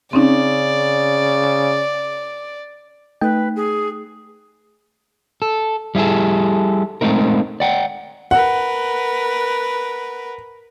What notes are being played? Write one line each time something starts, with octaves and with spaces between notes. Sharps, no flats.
C#3 C4 C#4 D#4 D5
A3 D#4 B4 G5
G#4
A4
G3 E4 F#4 G#4 A4
G#3 A3 C4 D#4 A#4
D5 F#5 G5
A#4 B4 F#5